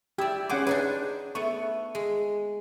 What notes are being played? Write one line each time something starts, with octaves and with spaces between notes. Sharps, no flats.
E4 G4 D5 E6
C#4 G#4 C5 F#5 D6
D4 D#4 G#4 B4
A3 B3 C#6
G#3